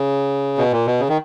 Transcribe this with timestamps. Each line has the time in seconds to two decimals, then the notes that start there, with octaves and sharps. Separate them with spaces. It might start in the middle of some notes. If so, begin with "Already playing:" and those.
Already playing: C#3
0.58 B2
0.72 A#2
0.87 B2
1.00 C#3
1.09 D#3